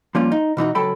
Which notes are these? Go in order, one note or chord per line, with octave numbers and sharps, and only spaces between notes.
F3 G3 A#3 C#4 F4
D#4
B2 E3 D#4 F#4
C#2 F#3 A4 G5 A5 B5